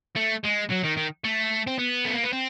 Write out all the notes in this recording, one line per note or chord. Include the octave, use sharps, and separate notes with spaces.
A3
G#3
F#3
D#3
D#3
A3
C4
B3
A3
A#3
B3
C4